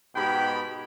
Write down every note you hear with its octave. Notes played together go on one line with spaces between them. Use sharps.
G#2 B2 G4 G5 B5